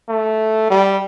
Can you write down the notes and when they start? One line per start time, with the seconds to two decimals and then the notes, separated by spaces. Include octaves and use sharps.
0.09 A3
0.70 G3